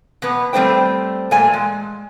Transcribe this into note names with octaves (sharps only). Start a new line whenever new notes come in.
B2 B3
G3 A3 C4 C5 G5
A#2 A3 G#5 A5
G#3